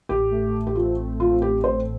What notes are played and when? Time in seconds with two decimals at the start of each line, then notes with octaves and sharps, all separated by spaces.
0.09 A1 G4
0.31 A3
0.53 A1
0.67 G4
0.75 C4 F4
0.98 A3
1.20 A3 F4
1.41 C4 G4
1.63 A2 C5